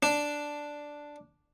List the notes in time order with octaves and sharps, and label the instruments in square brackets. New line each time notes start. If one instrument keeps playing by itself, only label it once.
[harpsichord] D4